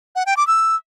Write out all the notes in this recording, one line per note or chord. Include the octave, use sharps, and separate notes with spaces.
F#5
G5
D6
E6